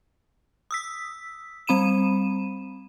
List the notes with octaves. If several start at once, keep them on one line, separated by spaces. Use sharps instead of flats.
D#6 E6 B6
G3 C4 B5 D#7 E7